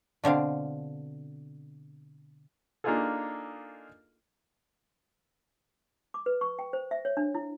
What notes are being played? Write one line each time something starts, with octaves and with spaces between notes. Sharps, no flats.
B2 D3 C4 F5
A#3 D4 D#4 F4 G#4 A4
D6
B4
C#6
G5
C5
E5
C#5
D4
E4